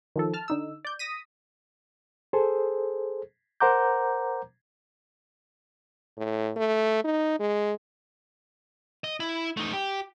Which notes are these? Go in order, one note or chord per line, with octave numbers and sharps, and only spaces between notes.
D#3 F3 A4
A5 F6
D3 D#4 E6
D5 G6
D#6 A#6 B6 D#7
G#4 A4 C5
A#4 C5 F#5 A#5 D6 G6
A2
A3
D#4
G#3
D#5
E4
A3 D#4
G4